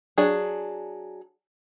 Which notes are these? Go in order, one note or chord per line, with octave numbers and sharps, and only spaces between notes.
F#3 D4 G#4